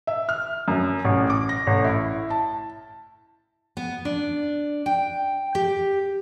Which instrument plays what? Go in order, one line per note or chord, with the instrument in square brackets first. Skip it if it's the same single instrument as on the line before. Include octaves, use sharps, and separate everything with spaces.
[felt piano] E5
F6
F#2
A1
D6
A#6
A1
E4
A5
[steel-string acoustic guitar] B3
D4
G5
G4